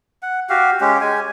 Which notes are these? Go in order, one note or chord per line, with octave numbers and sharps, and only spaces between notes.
F#5
F#4 G4 F5
G#3 C#4 G4
G#3 G#5